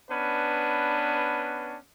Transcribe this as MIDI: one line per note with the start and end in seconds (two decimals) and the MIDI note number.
0.10 1.76 59
0.10 1.76 61
0.10 1.76 62
0.10 1.76 71